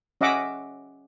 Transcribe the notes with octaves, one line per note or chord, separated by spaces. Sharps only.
C#4 D#5 E5 F#5 D6